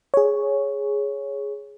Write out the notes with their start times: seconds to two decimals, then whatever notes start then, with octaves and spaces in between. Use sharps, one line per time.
0.14 G#4 C#5